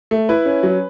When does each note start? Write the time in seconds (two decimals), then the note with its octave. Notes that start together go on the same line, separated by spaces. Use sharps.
0.11 A3
0.29 E4 B4
0.46 C#4
0.63 F#3